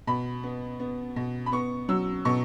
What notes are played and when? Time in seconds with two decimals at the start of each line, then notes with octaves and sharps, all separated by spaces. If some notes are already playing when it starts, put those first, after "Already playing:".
0.07 B2 B5
0.43 B3
0.80 B3
1.16 B2
1.46 B5
1.52 B3 C#6
1.89 F#3 E6
2.25 B2 C#6